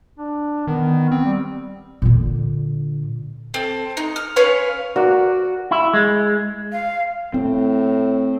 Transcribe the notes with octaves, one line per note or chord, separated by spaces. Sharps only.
D4
D#3 B3
C4
G3
A#2 D3
C4 A4
D#4
F6
C#4 B4 C#5 F5
F#4 A#4 D5
E4
G#3
F5
A2 C4